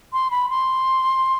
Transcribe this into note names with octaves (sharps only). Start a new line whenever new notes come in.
C6
B5
C6